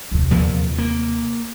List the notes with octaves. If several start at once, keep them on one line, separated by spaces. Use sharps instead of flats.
D#2 C3
E2 A#2 F3
A#3